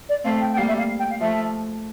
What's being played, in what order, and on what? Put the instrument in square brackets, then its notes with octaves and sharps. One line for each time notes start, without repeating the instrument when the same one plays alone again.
[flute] D5
[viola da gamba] A3 C4 [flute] F5
[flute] G5
G5
[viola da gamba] G3 A#3 [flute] F5
[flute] E5
F5
G5
F5
[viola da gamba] F3 A3 [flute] E5